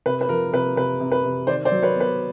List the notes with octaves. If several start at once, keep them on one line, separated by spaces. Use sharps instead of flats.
C3 B4
B4
F3 A#4
C3 B4
C3 B4
C3
B4
C3
D#3 C5 D5
C5 D5
F#3
B4 C#5
B3
B4